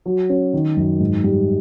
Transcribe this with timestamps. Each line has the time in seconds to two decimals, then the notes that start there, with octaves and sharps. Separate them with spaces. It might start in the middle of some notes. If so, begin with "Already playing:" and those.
0.06 F#3
0.29 C#4
0.53 D#3
0.77 F#2
1.00 G#2
1.24 G3